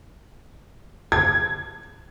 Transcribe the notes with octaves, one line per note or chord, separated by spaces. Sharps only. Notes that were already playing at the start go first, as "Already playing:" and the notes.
G#6